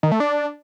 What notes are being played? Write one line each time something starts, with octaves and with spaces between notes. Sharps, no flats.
D#3
A3
D4